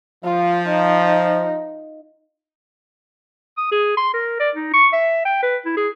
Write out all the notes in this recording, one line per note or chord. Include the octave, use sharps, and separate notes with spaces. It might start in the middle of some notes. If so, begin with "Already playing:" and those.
F3 F4
D#4
D#6
G#4
C6
A#4
D5
D#4
C#6
E5
G5
B4
E4
G#4